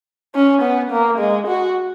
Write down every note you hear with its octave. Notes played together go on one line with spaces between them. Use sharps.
C#4
B3
A#3
G#3
F#4